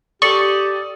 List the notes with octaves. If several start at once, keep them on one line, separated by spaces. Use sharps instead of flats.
G4 A4 D5 C#6 D#6